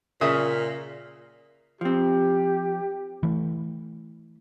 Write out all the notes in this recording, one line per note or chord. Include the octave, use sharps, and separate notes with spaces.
A#2 C#3 E5 D#6
F3 C4 G4
E3 A3